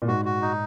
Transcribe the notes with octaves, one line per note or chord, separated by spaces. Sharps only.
A#2
G#2 F#4
F#4
D#4